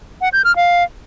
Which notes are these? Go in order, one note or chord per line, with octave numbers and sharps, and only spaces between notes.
F#5
G6
F6
F5